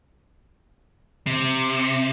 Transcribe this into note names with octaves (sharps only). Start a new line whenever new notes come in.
C3